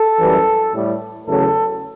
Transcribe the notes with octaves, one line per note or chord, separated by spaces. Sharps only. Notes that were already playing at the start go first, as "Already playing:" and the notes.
Already playing: A4
F#2 E3 G3
A2 G3
E2 C#3 F#3 A3 A4